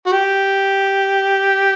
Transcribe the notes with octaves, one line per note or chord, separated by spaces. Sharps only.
F#4
G4